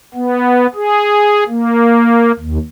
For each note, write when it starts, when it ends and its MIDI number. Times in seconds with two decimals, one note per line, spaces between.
0.14 0.67 59
0.75 1.44 68
1.48 2.32 58
2.39 2.58 39